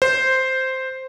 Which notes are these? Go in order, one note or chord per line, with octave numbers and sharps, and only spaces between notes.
C5